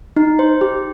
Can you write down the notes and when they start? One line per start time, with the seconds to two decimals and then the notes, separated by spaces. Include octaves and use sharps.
0.16 D#4
0.39 C5
0.61 G4